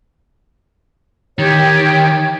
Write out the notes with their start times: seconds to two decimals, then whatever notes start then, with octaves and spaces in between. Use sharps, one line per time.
1.39 D#3 G4 C#5 G5